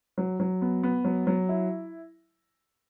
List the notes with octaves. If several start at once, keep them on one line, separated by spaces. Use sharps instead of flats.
F#3
F#3
B3
B3
F#3
F#3
E4